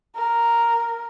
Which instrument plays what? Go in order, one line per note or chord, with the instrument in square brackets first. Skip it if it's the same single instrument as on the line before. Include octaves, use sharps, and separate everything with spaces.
[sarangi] A#4